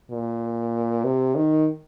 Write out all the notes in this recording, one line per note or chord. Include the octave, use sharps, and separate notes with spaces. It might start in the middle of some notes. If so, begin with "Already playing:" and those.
A#2
C3
D#3